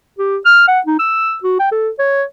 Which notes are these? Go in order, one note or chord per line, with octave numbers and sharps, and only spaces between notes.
G4
F6
F#5
D#4
E6
F#4
G5
A4
C#5